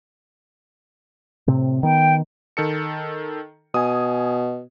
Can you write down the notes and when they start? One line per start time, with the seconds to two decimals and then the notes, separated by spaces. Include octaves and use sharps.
1.47 A2 C3 C4
1.83 D#3 B3 G5
2.57 D#3 A4 C#7
3.74 B2 G#5 D#6